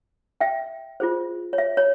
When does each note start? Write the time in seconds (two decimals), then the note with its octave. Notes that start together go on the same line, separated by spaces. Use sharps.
0.41 E5 G5
1.00 F4 G#4 C5
1.53 C#5
1.58 E5
1.77 C#5